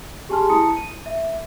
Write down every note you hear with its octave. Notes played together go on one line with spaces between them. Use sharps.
G4 G#4 G#5 A5 C6 F6
E4 A5 A#5 D#6 C#7
D#7
E5